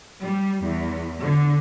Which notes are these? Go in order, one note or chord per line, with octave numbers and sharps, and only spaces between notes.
G3
E2
D3